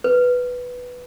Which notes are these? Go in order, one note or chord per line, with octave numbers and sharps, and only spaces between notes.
B4